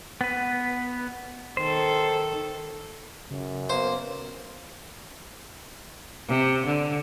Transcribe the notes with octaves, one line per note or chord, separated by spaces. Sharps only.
B3 B4
D#3 A4 C5
F#2 C#3
A#3 B3 B4 C5
C3
D3